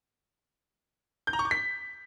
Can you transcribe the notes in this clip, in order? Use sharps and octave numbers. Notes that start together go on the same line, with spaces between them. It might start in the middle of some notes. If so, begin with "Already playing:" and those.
G6
A#5
C#6
D6
B6